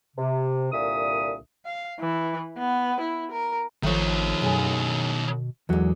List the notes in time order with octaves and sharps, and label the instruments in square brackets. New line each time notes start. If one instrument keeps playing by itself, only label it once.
[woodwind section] C3
C2 A#2 D3 E5 D#6
[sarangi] F5
E3
B3
E4
A#4
[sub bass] G#1 [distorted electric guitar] D#3 C#5 [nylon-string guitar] F3 A3
[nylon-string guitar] F#2 G#4 [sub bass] B2
[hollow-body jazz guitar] E2 F#3 [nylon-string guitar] D3 G#3